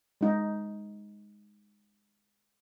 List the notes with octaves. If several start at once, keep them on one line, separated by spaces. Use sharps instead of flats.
G#3 D#4